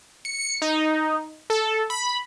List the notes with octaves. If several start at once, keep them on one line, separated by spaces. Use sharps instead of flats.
C#7
D#4
A4
B5